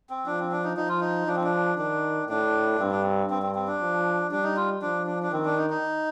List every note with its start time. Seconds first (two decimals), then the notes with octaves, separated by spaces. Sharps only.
0.10 C4
0.26 F3 D4
0.39 C4
0.52 D4
0.64 D#4
0.77 F3 D#4
0.89 F4
1.01 D#4
1.27 F3 D4
1.36 C4
1.44 D4
1.78 D#3 D4
2.29 A2 D4
2.79 G2 C4
2.91 D4
3.03 C4
3.30 G2 C4
3.42 C4
3.55 C4
3.68 D4
3.81 F3
4.31 G3 D4
4.44 D#4
4.56 F4
4.82 F3 D4
5.07 D4
5.23 D4
5.32 D#3 C4
5.45 D4
5.57 D#4
5.70 D#4